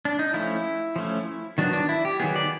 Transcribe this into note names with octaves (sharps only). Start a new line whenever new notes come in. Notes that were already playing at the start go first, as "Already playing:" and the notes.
D4
D#4
F3 A3 C#4 E4
F3 A3 C#4
D#3 F#3 B3 D4
D4
E4
G4
D#3 F#3 B3 G#4
D5